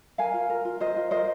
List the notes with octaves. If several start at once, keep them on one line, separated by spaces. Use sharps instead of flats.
A#4 F5 G#5
F4
A#4
F4
A#4 C5 D#5
F4
A#4 C5 D#5